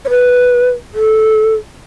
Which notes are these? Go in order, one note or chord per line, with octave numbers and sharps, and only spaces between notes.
C#5
B4
A4